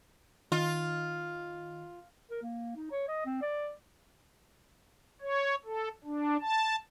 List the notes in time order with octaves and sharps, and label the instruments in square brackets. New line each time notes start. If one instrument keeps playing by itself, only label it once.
[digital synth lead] D#3 [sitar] F4
[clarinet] A#4
A#3
D#4
C#5
D#5
C4
D5
[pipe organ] C#5
A4
D4
A5